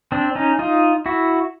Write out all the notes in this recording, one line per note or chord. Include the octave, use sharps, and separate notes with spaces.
C4 D4
C#4 D#4
D#4 F4
E4 F#4